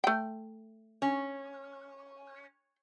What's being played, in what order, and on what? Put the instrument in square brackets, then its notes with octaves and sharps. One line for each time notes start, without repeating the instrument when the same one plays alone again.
[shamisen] A3 G5
[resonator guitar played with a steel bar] C#4